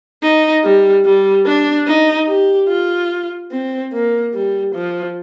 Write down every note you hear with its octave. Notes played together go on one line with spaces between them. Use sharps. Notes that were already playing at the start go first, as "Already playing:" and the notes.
D#4
G3
G3
D4
D#4
G4
F4
C4
A#3
G3
F3